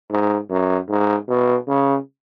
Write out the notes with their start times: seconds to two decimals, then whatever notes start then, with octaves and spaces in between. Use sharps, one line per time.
0.11 G#2
0.50 F#2
0.89 G#2
1.29 B2
1.68 C#3